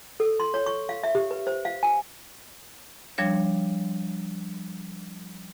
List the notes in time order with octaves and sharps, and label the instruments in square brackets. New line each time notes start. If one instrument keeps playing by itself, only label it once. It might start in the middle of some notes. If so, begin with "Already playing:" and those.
[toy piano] A4
C6
C#5
C#6
F5
E5
G4
B4
C5
F5
G#5
[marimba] F3 G3 D4 C#5